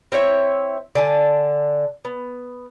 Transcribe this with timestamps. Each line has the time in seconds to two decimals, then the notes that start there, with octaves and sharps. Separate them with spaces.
0.12 C4 E4 C#5 E5
0.95 D3 G#5 A5
2.05 B3